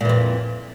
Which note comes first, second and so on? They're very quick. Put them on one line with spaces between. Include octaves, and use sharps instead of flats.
A#2 E3 F2